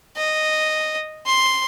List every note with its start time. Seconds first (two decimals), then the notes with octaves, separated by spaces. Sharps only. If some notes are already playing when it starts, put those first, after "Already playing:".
0.17 D#5
1.26 C6